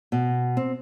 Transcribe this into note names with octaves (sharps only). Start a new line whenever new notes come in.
B2
C4